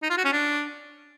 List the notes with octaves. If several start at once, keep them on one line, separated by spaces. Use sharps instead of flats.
D#4
F4
F#4
C#4
D4